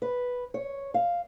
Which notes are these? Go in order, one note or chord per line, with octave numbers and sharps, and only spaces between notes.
B4
C#5
F5